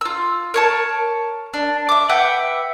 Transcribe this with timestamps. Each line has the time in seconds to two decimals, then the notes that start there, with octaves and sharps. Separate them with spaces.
0.01 F4 E6
0.54 A#4 C#5 A5
1.54 D4
1.89 E5 D6
2.09 B4 E5 F#5 G5